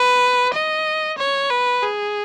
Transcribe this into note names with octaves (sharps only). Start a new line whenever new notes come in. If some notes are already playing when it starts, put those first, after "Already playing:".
Already playing: B4
D#5
C#5
B4
G#4